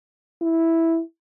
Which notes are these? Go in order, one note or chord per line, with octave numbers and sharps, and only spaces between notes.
E4